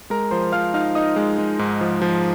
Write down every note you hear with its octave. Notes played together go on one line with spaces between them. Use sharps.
G#3 A#4 A#5
F3 C5 C6
F3 F5 F6
D#4 F5 F6
D#4 D#5 D#6
G#3
G#3
G#2
F3
F3